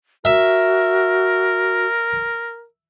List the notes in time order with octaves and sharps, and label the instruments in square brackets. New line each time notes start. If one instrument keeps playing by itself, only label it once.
[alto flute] F#4 [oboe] A#4 [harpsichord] E5